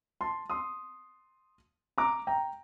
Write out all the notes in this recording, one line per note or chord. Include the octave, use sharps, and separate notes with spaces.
A5 C6
C6 D#6
A#5 D6
G5 A#5